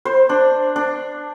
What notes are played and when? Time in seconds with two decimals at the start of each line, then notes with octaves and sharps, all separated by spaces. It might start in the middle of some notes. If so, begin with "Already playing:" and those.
0.05 C5
0.29 D4
0.76 D4